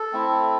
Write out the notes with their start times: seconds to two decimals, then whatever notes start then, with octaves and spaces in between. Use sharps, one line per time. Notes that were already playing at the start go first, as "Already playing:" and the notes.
Already playing: A4
0.13 A3 C4 E4